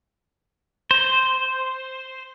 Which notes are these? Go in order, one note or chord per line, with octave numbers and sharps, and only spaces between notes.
C5